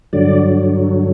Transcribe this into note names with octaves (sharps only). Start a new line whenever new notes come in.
G2 D3 F#3 D5